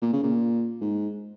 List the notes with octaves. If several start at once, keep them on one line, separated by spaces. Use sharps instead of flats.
A#2
C#3
A#2
G#2